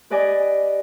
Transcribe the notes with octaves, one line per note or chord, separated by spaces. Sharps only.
G4 B4 D5 D#5 G#5 D6